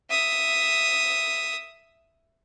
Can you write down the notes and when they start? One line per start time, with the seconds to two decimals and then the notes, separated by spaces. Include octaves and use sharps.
0.10 E5 D#6